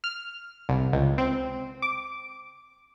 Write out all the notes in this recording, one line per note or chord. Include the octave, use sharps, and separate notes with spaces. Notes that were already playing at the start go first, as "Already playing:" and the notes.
F6
C2
C#2
C4
D6